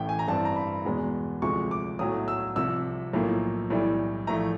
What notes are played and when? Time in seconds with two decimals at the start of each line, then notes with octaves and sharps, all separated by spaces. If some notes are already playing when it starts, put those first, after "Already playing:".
Already playing: A1 A2 E3 A3 G5
0.09 G#5
0.19 A#5
0.28 G2 E3 G3 C4 A5
0.45 A#5
0.56 B5
0.85 E2 B2 G#3 B3
1.42 D2 C3 F3 G#3 C#6
1.71 D6
1.99 B1 A2 F#3 A3 D#6
2.28 E6
2.56 C2 C3 F3 E6
3.13 B1 A2 F3 A#3
3.70 B1 A2 E3 G3
4.27 A#1 A2 E3 A3 A#5